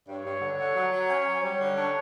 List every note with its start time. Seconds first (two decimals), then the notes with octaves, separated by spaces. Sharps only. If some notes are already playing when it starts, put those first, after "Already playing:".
0.08 G2 C#5
0.26 G2
0.42 D3
0.59 D3
0.76 F#3
0.92 F#3
1.09 C#4
1.26 F#3
1.43 G3 C#5
1.59 D3
1.76 D4